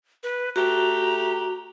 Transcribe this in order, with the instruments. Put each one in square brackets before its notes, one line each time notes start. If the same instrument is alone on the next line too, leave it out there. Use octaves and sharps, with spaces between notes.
[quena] B4
[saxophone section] A3 G4 [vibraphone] F#4 [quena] A#5